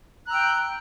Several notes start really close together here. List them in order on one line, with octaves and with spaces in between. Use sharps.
F#6 A#5 E6 G5